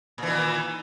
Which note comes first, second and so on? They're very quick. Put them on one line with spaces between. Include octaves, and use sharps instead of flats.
A#2 E3 D#3